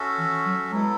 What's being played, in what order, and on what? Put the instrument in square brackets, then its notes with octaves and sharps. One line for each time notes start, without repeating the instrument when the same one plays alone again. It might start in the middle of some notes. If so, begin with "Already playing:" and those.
Already playing: [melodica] C#4 F#4 A4 E5
[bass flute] E3
F#3
[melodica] F#3 B3 E4 A4 [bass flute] G#3